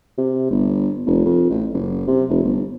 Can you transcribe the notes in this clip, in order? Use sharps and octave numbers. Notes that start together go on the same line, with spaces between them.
C3
G1
F1
F2
A1
F#1
C3
F1
G1